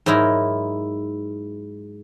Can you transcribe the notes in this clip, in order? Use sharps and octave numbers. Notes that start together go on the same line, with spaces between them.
G#2 F#3 D#4 E4 A#4